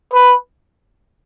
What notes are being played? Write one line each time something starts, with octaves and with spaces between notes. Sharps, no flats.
B4